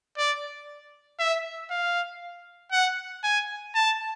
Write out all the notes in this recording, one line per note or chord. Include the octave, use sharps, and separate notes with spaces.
D5
E5
F5
F#5
G#5
A5